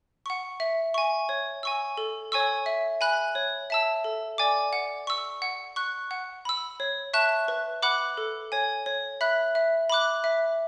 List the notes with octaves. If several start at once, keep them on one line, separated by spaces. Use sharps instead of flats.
F#5 C#6
E5
G#5 C#6
C#5
G#5 C#6 E6
A4
C#5 G#5 C#6 E6
E5
G#5 B5 F#6
C#5
E5 A5 E6
A4
D5 G#5 D6
F#5
C#6 E6
F#5
C#6 F#6
F#5
B5 E6
C#5
E5 A5 C#6 F#6
B4
F#5 B5 D6 F#6
A4
C#5 G#5
C#5
E5 B5 F#6
E5
B5 D6 F#6
E5